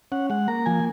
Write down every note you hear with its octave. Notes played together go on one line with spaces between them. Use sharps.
C#4 F#5
G#3 F#5
A#3 A#5
F3 G#5